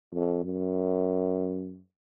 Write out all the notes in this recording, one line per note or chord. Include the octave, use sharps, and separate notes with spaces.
F2
F#2